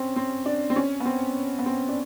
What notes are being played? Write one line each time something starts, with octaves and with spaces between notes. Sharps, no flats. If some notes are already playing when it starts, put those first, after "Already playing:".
Already playing: C4 C#4
C4
D4
C4
C#4
B3
C4
B3
C4
D4